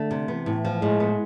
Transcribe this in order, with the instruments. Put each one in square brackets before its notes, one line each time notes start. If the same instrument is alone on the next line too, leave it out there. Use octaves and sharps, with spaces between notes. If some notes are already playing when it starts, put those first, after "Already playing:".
Already playing: [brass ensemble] D3 [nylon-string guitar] A3
[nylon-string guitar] C3
[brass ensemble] E3 [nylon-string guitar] B3
[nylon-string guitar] A2
F3
[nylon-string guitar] A2 [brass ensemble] G#3
[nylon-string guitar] B3